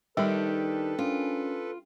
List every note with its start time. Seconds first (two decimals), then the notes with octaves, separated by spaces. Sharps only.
0.17 D#3 G3 D4 D#4 G4 A4 B4
0.99 C#4 D4 F4 A#4